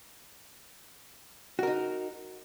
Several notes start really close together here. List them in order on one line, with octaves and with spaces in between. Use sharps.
F#4 A#4 D#4